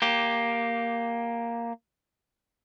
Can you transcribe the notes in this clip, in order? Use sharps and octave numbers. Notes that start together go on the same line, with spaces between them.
A#3 G4